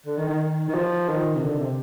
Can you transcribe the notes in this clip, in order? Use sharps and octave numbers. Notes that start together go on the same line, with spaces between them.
D3
D#3
D#3
D#3
F3
D#3
C3
D3
C3